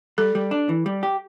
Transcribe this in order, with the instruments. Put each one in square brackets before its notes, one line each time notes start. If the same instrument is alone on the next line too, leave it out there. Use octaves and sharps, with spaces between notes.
[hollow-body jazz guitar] G3 [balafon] A4
[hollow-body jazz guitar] G3
D4
E3
G3
G4